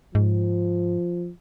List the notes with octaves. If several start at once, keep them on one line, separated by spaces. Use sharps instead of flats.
G#2 F3